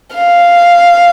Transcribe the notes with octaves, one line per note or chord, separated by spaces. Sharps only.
F5